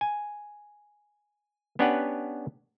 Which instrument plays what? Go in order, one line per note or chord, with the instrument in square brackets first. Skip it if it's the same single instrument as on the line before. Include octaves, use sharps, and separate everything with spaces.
[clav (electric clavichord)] G#5
B3 C#4 D4 G4 B4 F#5